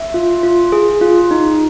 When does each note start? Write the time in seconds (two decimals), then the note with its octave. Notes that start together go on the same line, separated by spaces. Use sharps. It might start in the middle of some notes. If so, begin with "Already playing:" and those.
Already playing: E5
0.14 F4
0.43 F4
0.72 G#4
1.01 F4
1.31 D#4